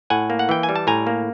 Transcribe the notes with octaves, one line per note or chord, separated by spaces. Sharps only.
A2 F#5 G#5
A#3
F#5
E3 G5
G#5
G3
A5
A2 G#5 A#5
A#3